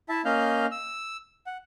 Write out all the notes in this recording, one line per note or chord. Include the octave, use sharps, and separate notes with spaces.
E4 E5 A5
A#3 C#4 D#5 F5 F6 G6
E6
F#5